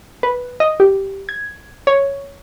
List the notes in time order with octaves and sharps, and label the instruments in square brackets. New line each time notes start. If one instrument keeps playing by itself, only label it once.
[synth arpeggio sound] B4
D#5
G4
G#6
C#5